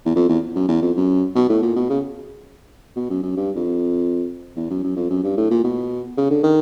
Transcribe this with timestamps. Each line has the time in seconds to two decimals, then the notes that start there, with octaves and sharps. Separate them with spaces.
0.05 E2
0.16 F2
0.29 E2
0.55 F#2
0.69 E2
0.82 F2
0.96 F#2
1.35 B2
1.49 A2
1.62 A#2
1.76 B2
1.90 C#3
2.96 B2
3.10 F#2
3.23 F#2
3.36 G2
3.56 F2
4.56 E2
4.70 F#2
4.84 F#2
4.96 F2
5.10 F#2
5.24 G2
5.37 A2
5.51 A#2
5.64 B2
6.17 C#3
6.31 D3
6.44 D#3